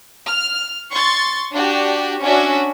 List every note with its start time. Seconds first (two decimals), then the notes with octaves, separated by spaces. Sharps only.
0.28 F6
0.92 C6 C#6 A6
1.52 D4 F#4 G4
2.20 C#4 D4 F#4 E5